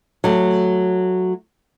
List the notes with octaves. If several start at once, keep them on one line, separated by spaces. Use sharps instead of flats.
F#3 A3